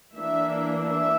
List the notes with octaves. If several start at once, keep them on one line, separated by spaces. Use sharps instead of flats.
E3 A#3 D4 E5
E5